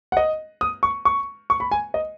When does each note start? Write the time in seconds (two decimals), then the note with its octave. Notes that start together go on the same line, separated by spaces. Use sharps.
0.12 F#5
0.17 D#5
0.61 D#6
0.83 C#6
1.05 C#6
1.50 C#6
1.60 B5
1.71 G#5
1.94 D#5